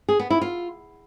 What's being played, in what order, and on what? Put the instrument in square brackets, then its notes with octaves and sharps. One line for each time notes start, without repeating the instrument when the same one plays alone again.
[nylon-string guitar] G#4
B3
E4
F4